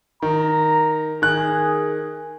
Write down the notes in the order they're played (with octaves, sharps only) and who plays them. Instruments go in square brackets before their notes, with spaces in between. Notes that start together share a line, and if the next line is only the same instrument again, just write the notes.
[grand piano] D#3 [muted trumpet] A#5
[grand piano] D#3 F#6 [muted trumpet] G#4